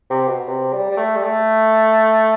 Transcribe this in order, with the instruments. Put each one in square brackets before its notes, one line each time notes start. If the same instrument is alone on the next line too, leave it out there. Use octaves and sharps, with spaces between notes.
[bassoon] C3
B2
C3
G3
G3
A3
G3
A3